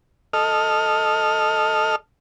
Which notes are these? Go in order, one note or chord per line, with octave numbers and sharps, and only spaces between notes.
A4 D#5 F6